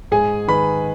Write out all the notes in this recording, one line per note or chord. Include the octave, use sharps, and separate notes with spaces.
G#2 G#4 G#5
D#3 B4 B5